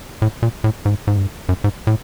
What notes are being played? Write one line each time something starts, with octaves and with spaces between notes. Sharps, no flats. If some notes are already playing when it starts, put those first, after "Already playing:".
A2
A#2
A2
G#2
G#2
G2
F#2
G#2
A2